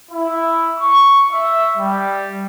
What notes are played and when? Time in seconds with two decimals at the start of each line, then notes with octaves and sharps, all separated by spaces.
0.11 E4
0.79 C#6
1.32 E5
1.77 G3